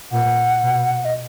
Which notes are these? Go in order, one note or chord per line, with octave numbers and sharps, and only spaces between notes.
A#2 F#5
B2
D#5